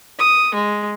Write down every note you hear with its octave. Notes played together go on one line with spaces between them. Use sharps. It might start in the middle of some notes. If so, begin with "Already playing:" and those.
D#6
G#3